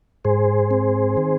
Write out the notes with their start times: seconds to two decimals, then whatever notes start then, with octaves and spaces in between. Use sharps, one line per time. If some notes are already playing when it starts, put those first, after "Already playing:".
0.25 G#2 G#4 C5
0.71 C4
1.17 D#3